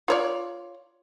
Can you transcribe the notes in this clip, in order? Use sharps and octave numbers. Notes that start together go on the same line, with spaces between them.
F4 C#5 D5